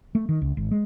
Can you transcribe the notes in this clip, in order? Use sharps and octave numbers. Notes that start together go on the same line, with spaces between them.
A3
D#3
C#2
G#1
G#3